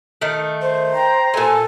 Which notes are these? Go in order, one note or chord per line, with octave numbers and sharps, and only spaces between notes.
D#3 A3
C5
G5 A#5
A#2 A4 G#5